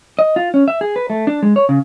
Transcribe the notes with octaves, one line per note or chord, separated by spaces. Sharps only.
D#5
F4
C#4
E5
G#4
B4
A3
D4
G#3
C#5
C#3